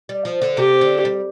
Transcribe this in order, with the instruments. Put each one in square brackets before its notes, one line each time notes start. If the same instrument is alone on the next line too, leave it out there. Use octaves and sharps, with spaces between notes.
[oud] G3
F3
D3
[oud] C3 [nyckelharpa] G4
[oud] D3
G3